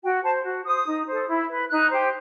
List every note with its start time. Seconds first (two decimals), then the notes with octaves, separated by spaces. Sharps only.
0.03 F#4 G5
0.24 C5 A5
0.45 F#4
0.66 C5 D#6
0.87 D#4
1.07 A4 C5
1.28 E4
1.49 B4
1.70 D#4 F#6
1.90 G4 C5